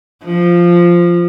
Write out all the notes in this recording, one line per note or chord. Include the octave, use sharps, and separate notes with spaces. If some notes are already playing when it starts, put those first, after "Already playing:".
F3